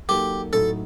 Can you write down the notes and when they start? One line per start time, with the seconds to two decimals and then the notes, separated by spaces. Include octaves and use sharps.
0.09 F#3 A#3 D#4 G4 A4
0.53 A2 F#3 A3 D#4 A4